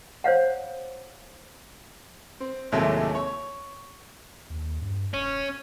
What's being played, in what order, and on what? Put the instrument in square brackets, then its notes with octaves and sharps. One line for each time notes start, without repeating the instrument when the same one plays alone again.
[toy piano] C5 C#5 F5 F#5
[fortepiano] C4
D#2 A2 C3 F#3 G#3 A3
C#5
[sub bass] D#2
G2
[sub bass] E1 [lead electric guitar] C#4